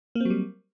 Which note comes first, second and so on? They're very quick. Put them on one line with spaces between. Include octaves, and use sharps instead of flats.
A#3 C4 F#3 G3